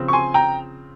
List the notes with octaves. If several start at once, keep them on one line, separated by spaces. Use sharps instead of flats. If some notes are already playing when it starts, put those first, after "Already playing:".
Already playing: C#3 F3 C4
C#6
G#5 C6
G5 A#5